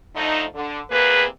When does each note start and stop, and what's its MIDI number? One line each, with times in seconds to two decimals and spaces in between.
0.16 0.44 50
0.16 0.44 53
0.16 0.44 57
0.16 0.44 63
0.54 0.81 50
0.91 1.24 40
0.91 1.24 48
0.91 1.24 58
0.91 1.24 68
0.91 1.24 71